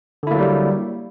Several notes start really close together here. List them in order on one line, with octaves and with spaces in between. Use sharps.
D3 E4 A#3 F#3 G3